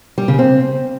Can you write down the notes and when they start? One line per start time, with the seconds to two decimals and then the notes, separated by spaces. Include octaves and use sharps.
0.18 G3
0.28 C#3
0.39 C4